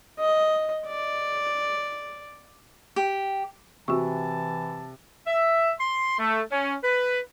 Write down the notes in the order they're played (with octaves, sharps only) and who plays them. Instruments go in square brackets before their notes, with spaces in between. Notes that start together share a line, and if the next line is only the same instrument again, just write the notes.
[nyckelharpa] D#5
D5
[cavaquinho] G4
[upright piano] C3 [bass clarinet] E3 [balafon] F#4 C#6 [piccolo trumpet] A5
[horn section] E5
C6
A3
C#4
B4